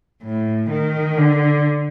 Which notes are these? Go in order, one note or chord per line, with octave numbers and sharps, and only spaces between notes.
A2
D#3
D3